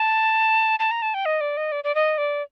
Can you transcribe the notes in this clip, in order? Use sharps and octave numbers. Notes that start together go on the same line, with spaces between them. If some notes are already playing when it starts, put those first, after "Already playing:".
Already playing: A5
A5
A#5
A5
G5
D#5
D5
D#5
D5
D5
D#5
D5